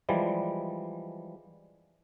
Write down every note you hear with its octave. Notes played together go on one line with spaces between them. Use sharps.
E3 F3 G3 G#3